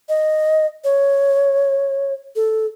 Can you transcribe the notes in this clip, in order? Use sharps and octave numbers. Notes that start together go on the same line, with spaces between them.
D#5
C#5
A4